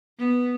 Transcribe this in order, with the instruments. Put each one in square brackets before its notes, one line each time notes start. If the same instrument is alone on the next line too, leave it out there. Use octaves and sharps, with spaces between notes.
[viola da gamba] B3